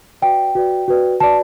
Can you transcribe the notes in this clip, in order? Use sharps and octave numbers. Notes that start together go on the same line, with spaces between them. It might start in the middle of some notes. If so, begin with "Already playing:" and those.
F#4 B4 D5 G5
F#4 B4 D5
F#4 B4 D5
F#4 B4 D5 A5